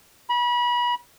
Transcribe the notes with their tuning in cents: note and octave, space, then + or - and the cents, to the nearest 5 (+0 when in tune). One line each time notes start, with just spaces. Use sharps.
B5 -30